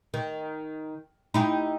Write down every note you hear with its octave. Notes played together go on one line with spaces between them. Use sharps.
D#3
D#4 E4 G4